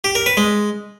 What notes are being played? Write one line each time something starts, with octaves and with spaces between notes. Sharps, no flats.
G4
A#4
B4
G#3